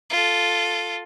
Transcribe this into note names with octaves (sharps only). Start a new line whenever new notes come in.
F4 A4